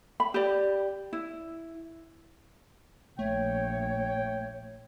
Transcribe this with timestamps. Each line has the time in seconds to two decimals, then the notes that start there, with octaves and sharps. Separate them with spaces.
0.20 B5
0.34 G4 D5
1.13 E4
3.19 A#1 A3 C#5 G5